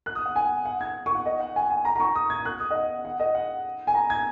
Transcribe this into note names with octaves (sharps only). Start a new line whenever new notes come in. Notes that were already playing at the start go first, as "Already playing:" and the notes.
F#6
D#6
F#5
G#5
F#5
G#6
C#6
F#5
D#5
F#5
G#5
G#5
A#5
A#5
C#6
D#6
G#6
F#6
D#6
D#5
F#5
F#5
D#5
F#5
G#5
A#5
G#6